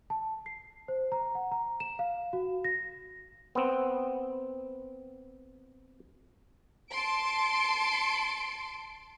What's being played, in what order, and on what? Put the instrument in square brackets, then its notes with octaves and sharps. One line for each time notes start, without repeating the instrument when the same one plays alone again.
[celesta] A5
C7
C5
A#5
F#5
A#5
E7
F5
F#4
A#6
[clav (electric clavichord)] B3 C4
[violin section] A5 C6 D7